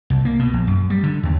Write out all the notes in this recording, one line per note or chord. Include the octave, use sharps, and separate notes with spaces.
C2
A#3
B2
A#1
F#2
G3
D3
D#2